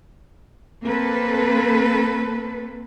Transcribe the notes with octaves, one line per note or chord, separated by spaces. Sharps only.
A#3 C4 A4 B4